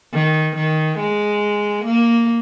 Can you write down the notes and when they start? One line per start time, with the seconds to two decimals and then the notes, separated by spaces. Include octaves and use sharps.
0.13 D#3
0.56 D#3
0.99 G#3
1.85 A#3